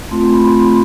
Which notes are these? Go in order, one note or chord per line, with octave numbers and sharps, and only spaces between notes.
A3 C4 F4 C6
B5